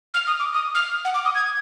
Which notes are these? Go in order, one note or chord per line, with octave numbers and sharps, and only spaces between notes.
F6
D#6
D6
D#6
F6
F#5
D6
D#6
G#6